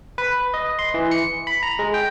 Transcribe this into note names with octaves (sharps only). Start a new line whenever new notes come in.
B4
D#5
C6
E3
C#7
B5
A#5
G#3
G5